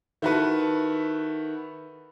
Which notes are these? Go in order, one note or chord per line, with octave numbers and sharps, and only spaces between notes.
D#3 E4 F#4 A4 B4